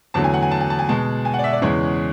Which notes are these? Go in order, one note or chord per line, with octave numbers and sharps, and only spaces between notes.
E2 D3 F#3 A3 A5
G#5
F#5
G#5
A5
G#5
A5
G#5
B2 G#3 A5
G#5
F#5
D5
E5
D5
E2 C#3 E3 G#3 C#5